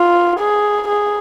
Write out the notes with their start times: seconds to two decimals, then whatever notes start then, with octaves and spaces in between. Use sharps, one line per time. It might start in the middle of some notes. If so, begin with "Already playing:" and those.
Already playing: F4
0.40 G#4
0.88 G#4